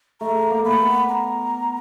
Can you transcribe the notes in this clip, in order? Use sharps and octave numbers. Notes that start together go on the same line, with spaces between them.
A3 A#5
A#3
A3
A#3 B5
B3
A#5